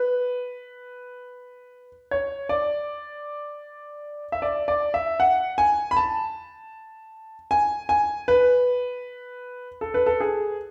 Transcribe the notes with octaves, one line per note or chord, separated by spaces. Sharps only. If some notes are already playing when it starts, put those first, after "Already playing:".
Already playing: B4
C#5
D5
E5
D5
D5
E5
F#5
G#5
B5
A5
G#5
G#5
B4
A4
B4
A4
G#4